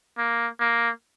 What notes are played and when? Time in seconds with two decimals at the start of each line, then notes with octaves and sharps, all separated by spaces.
0.18 A#3
0.60 A#3